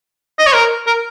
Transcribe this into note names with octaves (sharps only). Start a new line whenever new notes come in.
D#5
C#5
A#4
A#4